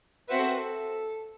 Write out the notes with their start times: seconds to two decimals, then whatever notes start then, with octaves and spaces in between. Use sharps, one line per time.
0.28 C4 F#4 B4 C5 E5
0.39 A4
0.48 B4
0.58 A4